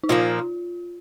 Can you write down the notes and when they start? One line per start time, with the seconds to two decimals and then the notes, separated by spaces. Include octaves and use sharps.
0.03 D#4
0.09 A#2 F3 A#3 F4